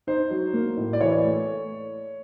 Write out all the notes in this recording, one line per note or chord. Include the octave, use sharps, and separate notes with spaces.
D#4 C5
F#3
A#3
A2
D5
E3 C#5
A3